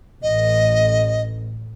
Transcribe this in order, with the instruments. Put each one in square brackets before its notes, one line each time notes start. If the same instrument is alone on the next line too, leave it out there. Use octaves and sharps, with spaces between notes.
[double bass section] A1 [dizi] D#5